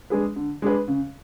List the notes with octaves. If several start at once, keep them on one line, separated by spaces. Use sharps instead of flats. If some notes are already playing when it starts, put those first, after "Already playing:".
G#3 D4 G#4 B4
D3
G#3 D4 G#4 B4
C#3